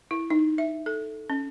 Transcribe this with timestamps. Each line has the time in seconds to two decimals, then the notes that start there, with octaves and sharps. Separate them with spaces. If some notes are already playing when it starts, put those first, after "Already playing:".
0.11 E4
0.30 D#4
0.58 E5
0.86 A4
1.30 C#4